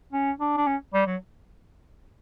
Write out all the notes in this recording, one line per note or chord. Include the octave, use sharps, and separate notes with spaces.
C#4
D4
D4
C#4
G3
F#3